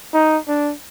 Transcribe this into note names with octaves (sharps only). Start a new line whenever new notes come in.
D#4
D4